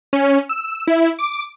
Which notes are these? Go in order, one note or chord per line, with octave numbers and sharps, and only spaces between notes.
C#4
E6
E4
D6